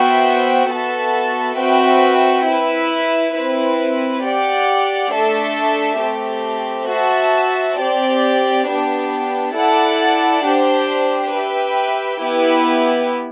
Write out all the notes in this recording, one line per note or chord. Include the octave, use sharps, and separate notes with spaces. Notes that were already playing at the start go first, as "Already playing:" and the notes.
Already playing: B3 F#4 C5 E5 G5
B3 F#4 A4 E5 A5
C4 F#4 B4 E5 G5
E4 B4 E5
C4 E4 B4
G4 D5 F#5
A3 D4 A4 E5
A3 C4 G4
F#4 C5 E5 A5
C4 G4 D5
B3 D4 G4
E4 A4 D5 F#5 A5
D4 G4 C5
G4 B4 E5 G5
B3 E4 G4 B4